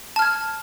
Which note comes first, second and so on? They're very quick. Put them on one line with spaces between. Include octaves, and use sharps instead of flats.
A5 F6 G#6